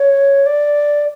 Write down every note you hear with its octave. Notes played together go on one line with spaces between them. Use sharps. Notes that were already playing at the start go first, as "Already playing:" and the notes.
Already playing: C#5
D5